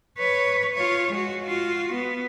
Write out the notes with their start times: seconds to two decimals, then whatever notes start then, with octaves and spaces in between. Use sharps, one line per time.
0.18 B4 C#5
0.75 F4 C#5
1.11 G#3 F#4
1.44 F4 F#4
1.93 B3